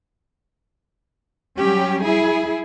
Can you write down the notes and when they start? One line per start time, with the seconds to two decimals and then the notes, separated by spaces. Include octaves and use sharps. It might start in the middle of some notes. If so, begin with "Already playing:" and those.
1.58 F#3 G3 C#4 G4
2.04 E4 G#4